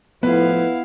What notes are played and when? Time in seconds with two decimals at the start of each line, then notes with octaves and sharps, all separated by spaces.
0.23 A2 F3 B3 E4 B4 F5